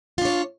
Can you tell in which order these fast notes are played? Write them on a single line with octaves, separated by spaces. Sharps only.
F4 D4 C#5